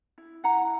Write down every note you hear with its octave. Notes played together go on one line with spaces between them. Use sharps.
E4
E4 F#5 A#5